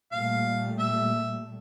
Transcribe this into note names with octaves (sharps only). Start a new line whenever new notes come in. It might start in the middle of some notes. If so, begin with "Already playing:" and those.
A#2 G3 A3 F5
E5